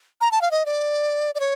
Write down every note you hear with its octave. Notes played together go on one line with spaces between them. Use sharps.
A#5
A5
F5
D#5
D5
D5
C#5